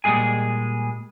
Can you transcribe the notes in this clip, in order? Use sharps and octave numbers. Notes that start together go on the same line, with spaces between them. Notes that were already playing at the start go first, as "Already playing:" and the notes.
A#2 G3 G#3 G#4 G#5